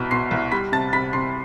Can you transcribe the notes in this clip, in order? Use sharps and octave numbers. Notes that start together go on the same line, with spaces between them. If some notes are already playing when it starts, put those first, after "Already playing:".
Already playing: C2 B2 B5
B2 C6 C7
C2
G3 B5 B6
C3 A5 A6
C3 B5 B6
C3 C6 C7